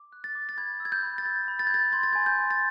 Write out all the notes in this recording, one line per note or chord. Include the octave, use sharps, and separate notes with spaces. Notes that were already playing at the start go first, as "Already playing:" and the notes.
Already playing: D6
F#6
A6
D6
A6
B5 G#6
E6
G#6
G6
B5
A6
E6 G#6
B5
A6
G#6
G6 A6
C6 G#6
A6
G#5 G#6
G6
C6
A6